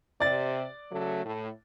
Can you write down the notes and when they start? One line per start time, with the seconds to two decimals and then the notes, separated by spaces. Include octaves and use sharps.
0.20 C3 D5 A6
0.92 C#3 F#3 A3
1.25 A2